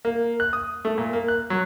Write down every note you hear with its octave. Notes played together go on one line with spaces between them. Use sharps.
A#3
F#6
D#6
A3
A#2
A#3
F#6
F#3